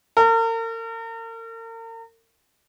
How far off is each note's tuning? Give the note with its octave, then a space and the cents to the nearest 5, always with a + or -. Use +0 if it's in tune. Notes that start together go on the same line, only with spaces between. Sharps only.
A#4 -40